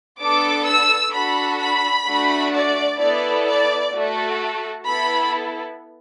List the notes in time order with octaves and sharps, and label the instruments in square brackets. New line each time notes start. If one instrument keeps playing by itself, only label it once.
[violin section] B3 D4 A4 D6
E6
D4 F#4 A4 B5
B5
A3 D4 F#4
D5
B3 E4 A4 D5
D5
A3 F#4 A4
B3 E4 A4 B5